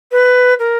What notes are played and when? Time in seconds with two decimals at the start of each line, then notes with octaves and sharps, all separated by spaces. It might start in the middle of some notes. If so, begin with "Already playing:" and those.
0.12 B4
0.59 A#4